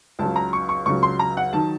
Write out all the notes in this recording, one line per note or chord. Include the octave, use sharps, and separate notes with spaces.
C#2 C#3 F#3 A5
A#5
C#6
C#6
C#2 C#3 F#3 C#6
C6
A#5
F#5
D#3 F#3 A5